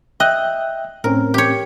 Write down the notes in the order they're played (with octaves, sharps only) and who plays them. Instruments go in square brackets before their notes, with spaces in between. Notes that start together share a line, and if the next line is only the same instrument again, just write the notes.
[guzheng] D#5 [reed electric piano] E5 G5 F#6
[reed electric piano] A2 C4 C#4 [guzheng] A#4
[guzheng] G4 C#5